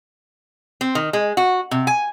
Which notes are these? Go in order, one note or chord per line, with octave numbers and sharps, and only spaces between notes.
C4
D#3
G#3
F#4
C3
G#5